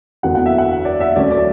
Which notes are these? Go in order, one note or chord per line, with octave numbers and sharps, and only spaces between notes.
F#1 E2 D3 F#3 B3 F#5
F#5
E5
F#5
D5
E5
D2 D3 F#3 C#4 D5
D5